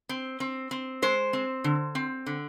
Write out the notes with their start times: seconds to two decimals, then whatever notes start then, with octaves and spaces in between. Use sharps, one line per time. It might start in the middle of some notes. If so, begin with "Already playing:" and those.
0.09 C4
0.40 C4
0.71 C4
1.02 G#3 C5
1.33 C4
1.64 D3
1.95 C4
2.26 D3